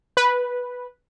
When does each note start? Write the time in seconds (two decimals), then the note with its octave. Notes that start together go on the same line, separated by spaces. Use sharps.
0.17 B4